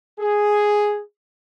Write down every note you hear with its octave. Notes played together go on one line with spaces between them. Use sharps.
G#4